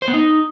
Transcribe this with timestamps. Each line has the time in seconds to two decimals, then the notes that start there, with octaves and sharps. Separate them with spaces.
0.02 C5
0.08 B3
0.13 D#4